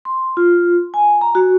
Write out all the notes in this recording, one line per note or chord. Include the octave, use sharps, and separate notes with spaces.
C6
F4
G#5
A#5
F#4